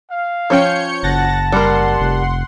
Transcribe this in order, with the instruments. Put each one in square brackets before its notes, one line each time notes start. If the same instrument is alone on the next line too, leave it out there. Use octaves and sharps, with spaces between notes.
[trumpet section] F5
[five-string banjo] F3 C#4 G5 [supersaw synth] C#5 G6 C#7
[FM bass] F#1 [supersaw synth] F#5 A6 A#6 [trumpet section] A5
[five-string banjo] G3 A#4 [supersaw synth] F#5 C6
[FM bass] F1